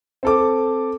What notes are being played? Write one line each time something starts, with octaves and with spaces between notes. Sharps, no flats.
C4 A4 D6